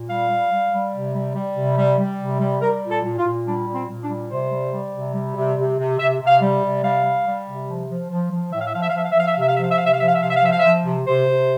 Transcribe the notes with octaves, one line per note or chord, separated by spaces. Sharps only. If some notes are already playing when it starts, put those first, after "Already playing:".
Already playing: A#2
G3 F5
G3
G3
G3
C3
G3
G3
C3
G3
G3
C3
G3
G3 A#4
A#2
A4
A#2
F4
A#2
G3 D4
A#2
C4
A#2
D4
G3
C3 C5
G3
G3
C3
G3
C3
C3
C3
C3 E5
C3
F5
G3
C3
G3 F5
G3
G3
C3
F3
F3
F3
F3
A2 E5
F5
E5
F3 F5
E5
F5
F3 E5
F5
E5
F3 F5
E5
F5
C3 E5
F5
F3 E5
F5
E5
C3 F5
E5
F5
F3 E5
F5
E5
C3 F5
E5
F5
F3 E5
F5
F3 E5
C3
C3 C5
C3